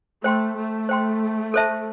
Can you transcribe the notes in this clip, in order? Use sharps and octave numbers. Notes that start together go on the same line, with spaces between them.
A3 C5 G5 C6
A3
C5 G5 C6
A4 C5 E5 A5